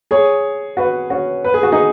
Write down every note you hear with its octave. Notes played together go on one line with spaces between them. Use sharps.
G#4 C#5
F#4 B4
C#4 F#4
B4
G#4
F#4
D#4 G#4